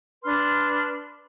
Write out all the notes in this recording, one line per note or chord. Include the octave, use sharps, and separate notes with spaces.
D4 B4 C6 F6